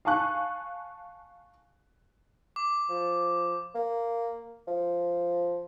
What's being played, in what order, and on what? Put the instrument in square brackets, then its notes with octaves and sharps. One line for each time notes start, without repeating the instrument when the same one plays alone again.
[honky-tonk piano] F5 G#5 A5 C#6 F#6
[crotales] D6
[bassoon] F3
A#3
F3